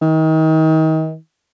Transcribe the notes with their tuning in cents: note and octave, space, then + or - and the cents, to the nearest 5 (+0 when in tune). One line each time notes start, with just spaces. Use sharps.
D#3 +30